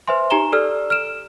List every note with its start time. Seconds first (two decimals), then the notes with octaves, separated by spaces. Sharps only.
0.08 B4 C5 E5 G#5 C6
0.30 D#4 G4 G#5 A#5 E7 G7
0.52 G4 A4 D5 E6 F6
0.90 F6 D7 E7